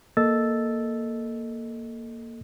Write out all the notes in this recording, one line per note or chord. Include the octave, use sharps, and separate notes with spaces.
A#3 A4 D#5 E6 A6